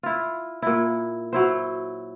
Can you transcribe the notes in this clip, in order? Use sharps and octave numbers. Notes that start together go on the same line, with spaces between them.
E4 F4
A#2 E4
F#3 E4 C5